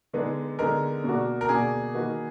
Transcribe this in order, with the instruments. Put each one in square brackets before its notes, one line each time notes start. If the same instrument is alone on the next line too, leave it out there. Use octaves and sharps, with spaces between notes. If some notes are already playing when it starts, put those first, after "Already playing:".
[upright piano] D3 G#3 B3 D#4 G#4
[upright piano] D3 G#3 B3 D#4 G#4 [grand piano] A#4
[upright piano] B2 A#3 D4 F#4
[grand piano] A#4
[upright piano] B2 A#3 D4 F#4 [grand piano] G#4
[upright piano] D#3 A#3 D#4 F#4 B4